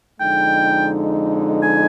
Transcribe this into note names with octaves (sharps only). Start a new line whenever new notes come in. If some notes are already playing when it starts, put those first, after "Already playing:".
F2 D3 G#3 D#4 G5
G#5